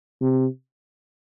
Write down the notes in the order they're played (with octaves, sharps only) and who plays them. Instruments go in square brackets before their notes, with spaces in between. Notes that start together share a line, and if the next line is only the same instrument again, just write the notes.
[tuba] C3